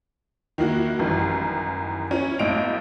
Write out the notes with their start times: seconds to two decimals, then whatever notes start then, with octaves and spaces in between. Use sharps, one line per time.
0.58 D#3 A#3 E4 F#4
0.99 A1 F#2 D#3 E3 G3
2.11 C#4 E4
2.39 B1 A2 D#4 D7 F7